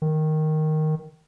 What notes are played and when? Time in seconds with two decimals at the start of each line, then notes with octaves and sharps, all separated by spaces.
0.02 D#3